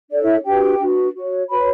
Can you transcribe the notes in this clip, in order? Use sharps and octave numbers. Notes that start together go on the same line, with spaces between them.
D4 A4 C#5 D5
E4 E5
D4 F#4 G4 B4 G5
D4 F#4 B4
F#4 C#5
F#4 B4 C#5 B5